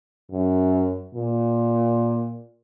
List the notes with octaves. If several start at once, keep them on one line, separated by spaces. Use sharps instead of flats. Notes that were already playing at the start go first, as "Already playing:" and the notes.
F#2
A#2